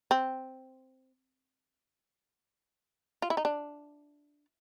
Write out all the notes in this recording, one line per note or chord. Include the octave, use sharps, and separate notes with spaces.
C4
F4
E4
D#4
D4